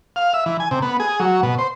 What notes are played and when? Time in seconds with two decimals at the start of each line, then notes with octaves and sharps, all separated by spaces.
0.16 F5
0.34 E5
0.46 E3
0.60 G#5
0.71 C3
0.82 B3
1.00 G#4
1.20 F#3
1.43 B2
1.58 C5